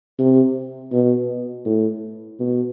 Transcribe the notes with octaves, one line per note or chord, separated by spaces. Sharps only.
C3
B2
A2
B2